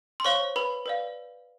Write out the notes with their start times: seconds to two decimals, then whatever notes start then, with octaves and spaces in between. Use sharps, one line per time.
0.20 C6
0.24 C5 C#5 F5 C#6
0.56 B4 B5
0.86 B4 D5 F5